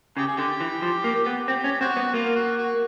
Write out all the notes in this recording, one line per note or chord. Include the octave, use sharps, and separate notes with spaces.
C#3 G4
G#4
D3 G4
E3
F3
A#3
B3
C4 G4
C#4
C4 F#4
B3
A#3 F4
F#4
F#4